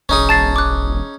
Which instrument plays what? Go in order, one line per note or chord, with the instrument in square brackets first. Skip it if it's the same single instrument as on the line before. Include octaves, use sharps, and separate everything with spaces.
[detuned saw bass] E1 [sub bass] A#1 [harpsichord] C#4 D#4 G#4
[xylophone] A5 A6 C7
D6 F#6